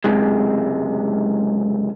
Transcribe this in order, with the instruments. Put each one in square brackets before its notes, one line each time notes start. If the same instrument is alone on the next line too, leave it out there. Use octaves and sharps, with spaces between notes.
[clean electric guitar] C#2 F#2 C3 G#3